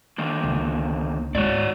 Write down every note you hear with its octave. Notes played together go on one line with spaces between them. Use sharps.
D3 D#3 A#3
C#2
G#2 F#4 C#5 D5